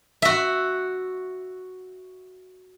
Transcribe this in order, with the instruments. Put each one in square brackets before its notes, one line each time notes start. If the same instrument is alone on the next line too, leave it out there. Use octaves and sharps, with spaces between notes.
[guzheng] F#4 E5